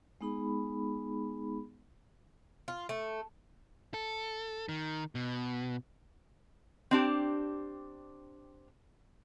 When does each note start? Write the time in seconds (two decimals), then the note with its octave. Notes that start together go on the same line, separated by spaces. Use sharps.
0.21 G#3 B3 D#4 G#4 B5
2.68 F4
2.89 A3
3.94 A4
4.69 D#3
5.15 B2
6.91 C4 D4 G4